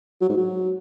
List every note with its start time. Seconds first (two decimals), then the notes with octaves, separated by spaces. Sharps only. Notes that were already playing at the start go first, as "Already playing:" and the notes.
0.21 F#3
0.29 G#2
0.37 F#3